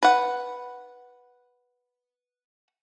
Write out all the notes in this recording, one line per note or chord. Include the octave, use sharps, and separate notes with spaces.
B4 F#5